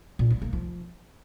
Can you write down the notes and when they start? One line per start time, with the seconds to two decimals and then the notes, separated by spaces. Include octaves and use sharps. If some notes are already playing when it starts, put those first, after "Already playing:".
0.19 A#2
0.30 A#3
0.42 A#3
0.53 F3